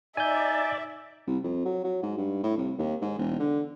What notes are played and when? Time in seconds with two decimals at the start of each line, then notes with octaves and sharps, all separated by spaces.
0.17 D#4 D5 E5 G#5 G6
1.27 C2
1.44 F2
1.65 F#3
1.84 F#3
2.03 G#2
2.17 G2
2.43 A2
2.57 C2
2.78 D#2
3.01 G#2
3.19 E1
3.40 D3